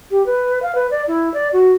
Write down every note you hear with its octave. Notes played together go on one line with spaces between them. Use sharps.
G4
B4
F5
B4
D5
E4
D5
F#4